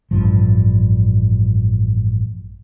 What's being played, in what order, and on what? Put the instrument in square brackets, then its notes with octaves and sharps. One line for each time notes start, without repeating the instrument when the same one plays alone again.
[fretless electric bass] A1 G2 F3